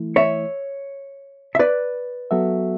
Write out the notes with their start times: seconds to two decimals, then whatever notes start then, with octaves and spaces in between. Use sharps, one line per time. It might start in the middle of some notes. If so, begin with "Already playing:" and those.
Already playing: E3 A3 E4
0.16 C#5 E5
1.55 E5
1.59 B4 D5
2.31 F#3 B3 F#4 A4 E5